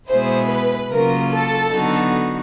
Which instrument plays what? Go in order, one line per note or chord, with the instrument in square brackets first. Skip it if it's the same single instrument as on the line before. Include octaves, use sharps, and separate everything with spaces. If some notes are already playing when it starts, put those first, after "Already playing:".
[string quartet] B2 G#3 B3 E4 G#4 [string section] C5
[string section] B4
[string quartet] C#3 F#3 A#3 C#4 F4 [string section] A#4
[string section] A4
[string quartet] D3 F#3 B3 D#4 F#4